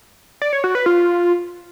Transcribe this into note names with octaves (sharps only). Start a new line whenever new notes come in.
D5
C#5
F#4
B4
F4